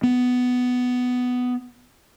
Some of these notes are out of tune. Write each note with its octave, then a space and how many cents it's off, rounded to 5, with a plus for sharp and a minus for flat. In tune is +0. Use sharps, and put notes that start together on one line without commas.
B3 +10